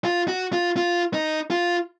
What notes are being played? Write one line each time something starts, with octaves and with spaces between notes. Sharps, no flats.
F4
F#4
F4
F4
D#4
F4